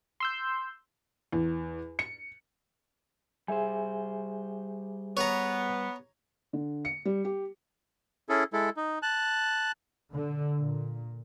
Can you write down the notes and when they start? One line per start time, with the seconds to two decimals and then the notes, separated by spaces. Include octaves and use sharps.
0.20 C6 E6 G6
1.33 E2
1.99 C#7
3.48 G3 G#4 C5 E5 G#5
5.17 B3 C#5 A#5
6.53 D3
6.85 C#7
7.05 G3
7.25 G4
8.29 C#4 E4 G#4 A4
8.53 G#3 E4 A4
8.77 D#4
9.02 A5 F#6
10.12 D3
10.61 A#2